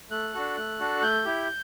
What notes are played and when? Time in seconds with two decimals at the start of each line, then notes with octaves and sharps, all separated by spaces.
0.10 A3 F#6
0.33 D4 F#4 A4
0.57 A3
0.80 D4 F#4 A4
1.02 A3 G6
1.25 E4 G4